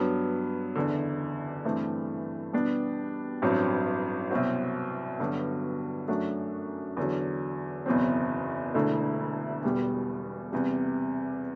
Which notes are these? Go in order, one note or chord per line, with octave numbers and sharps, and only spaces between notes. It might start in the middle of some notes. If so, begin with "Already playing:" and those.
Already playing: G2 F#3 B3
F#1 E2 D3
G2 E3 A3 C4
B2 G3 B3 D4 G4
A1 G2 F#3 C4
C2 B2 F#3 C4 F#4
G2 D3 F#3 B3 F#4
F#2 F#3 A3 D4 F#4
E2 D3 F#3
F#1 E2 B2 F#3 C4
E1 D2 D3 A3 E4
E1 E2 B2 G3
E2 C3 G3